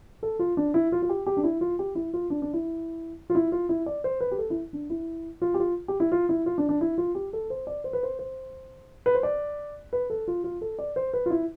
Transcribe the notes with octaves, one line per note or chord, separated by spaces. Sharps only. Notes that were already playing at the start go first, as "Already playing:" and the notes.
A4
F4
D4
E4
F4
F4
G4
G4
D4
E4
F4
G4
E4
F4
D4
D4
E4
F4
E4
F4
E4
D5
C5
B4
G4
A4
E4
D4
E4
F4
G4
F4
G4
E4
F4
E4
F4
D4
D4
E4
F4
G4
A4
C5
D5
C5
B4
C5
C5
B4
C5
D5
B4
A4
F4
F4
A4
D5
C5
B4
F4
E4